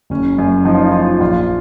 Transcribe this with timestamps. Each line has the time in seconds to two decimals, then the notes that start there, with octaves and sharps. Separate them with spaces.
0.10 F#1 C#4
0.38 F#2
0.65 F3 D#4
0.75 F4
0.83 D#4
0.92 F3 F4
1.00 D#4
1.20 A#1 F4